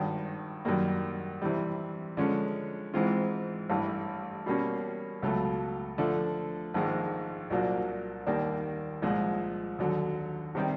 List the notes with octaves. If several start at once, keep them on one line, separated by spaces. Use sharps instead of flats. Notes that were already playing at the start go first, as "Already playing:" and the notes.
Already playing: G#1 G2 D#3
F#2 D#3 G3 A#3
C3 E3 G3
D3 F3 G#3 C#4
G#2 E3 G#3 C4 F4
A1 G2 E3
B2 G3 A#3 C#4
C#2 B2 F#3 A3
D3 F3 A3
A#1 G#2 D#3 G#3
C2 A#2 F#3 A#3 D4
D#2 D#3 G3 A#3 D4
C2 A#2 F3 G#3
D#2 D3 F#3
C3 D#3 G3 C4